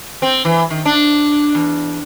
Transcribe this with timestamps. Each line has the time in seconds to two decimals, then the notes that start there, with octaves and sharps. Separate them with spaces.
0.22 C4
0.45 E3
0.70 D#3
0.85 D4
1.55 E2